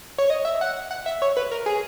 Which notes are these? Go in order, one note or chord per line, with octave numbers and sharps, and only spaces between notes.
C#5
D#5
E5
F#5
F#5
E5
C#5
B4
A#4
G#4